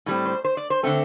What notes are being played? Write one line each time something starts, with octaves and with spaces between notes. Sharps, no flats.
A2 G3 C4
C5
C5
D5
C5
D3 A3 C4 A4